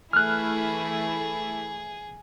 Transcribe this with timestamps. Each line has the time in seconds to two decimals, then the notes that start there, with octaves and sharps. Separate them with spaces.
0.13 E3 A3 E4 G#4 F6 F#6